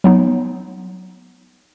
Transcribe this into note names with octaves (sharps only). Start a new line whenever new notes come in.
F#3 B3 D#4